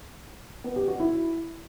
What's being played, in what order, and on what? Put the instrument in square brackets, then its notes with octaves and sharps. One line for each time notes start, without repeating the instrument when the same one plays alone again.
[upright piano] B3
G4
F#4
E4